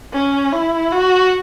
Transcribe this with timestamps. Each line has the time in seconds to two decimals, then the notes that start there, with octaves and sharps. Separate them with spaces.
0.13 C#4
0.52 E4
0.92 F#4